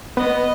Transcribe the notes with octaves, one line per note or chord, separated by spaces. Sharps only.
B3 D#5